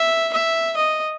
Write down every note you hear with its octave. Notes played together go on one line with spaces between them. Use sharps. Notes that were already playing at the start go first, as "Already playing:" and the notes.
Already playing: E5
E5
D#5